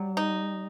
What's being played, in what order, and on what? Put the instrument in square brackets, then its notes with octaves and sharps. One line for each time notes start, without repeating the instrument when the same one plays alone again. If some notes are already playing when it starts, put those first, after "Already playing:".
Already playing: [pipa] F#3 [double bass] G3
[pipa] D#4